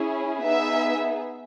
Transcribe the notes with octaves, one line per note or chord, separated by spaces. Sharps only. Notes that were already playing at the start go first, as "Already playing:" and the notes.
Already playing: C#4 E4 G#4
B3 D#4 G#4 E5